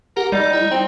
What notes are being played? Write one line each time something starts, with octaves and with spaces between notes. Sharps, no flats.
G4 A#4 F#5
G3 D#4 D5
E4
C4